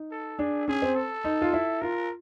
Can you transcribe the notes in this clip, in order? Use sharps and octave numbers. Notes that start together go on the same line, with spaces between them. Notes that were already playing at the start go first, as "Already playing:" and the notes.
Already playing: D#4
A4
D4 G#4
C#4 G#4
C4
A4
D#4
F4
E4
F4 A#4